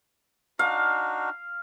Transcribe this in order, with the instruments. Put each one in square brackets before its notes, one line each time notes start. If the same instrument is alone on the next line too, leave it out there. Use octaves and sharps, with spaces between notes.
[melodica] D4 D#4 F#4 [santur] F5